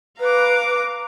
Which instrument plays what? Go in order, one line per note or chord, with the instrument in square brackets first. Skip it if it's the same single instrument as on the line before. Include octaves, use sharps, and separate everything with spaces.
[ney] B4 [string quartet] F5 A#5 D6